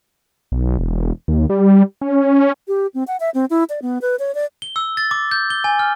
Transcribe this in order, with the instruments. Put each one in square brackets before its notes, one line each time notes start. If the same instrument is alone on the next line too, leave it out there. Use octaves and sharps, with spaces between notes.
[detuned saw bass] B1
E1
D#2
G3
C#4
[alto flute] G4
C4
F#5
E5
C4
E4
D5
B3
B4
C#5
D5
[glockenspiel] G7
E6
A6
D6
G6
G7
G#5
F6